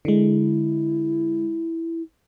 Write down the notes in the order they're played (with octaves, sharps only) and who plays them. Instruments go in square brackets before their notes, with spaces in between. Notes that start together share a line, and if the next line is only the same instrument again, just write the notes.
[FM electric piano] D3 G#3 [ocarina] E4